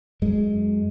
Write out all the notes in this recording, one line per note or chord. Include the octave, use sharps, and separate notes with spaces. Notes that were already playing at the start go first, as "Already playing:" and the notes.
F#2 G#3